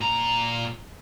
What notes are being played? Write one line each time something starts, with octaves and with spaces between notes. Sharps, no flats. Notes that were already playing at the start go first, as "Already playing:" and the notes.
A#2 A#5